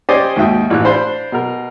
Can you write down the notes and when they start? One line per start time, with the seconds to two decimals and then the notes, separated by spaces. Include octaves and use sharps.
0.09 C#4 G4 C5 D5 D#5 G#5
0.36 D#2 G#2 F#4 E5 G5 D#6
0.70 A1 E3 F#6
0.85 D4 C5 F5 B5 C6
1.32 B2 A#4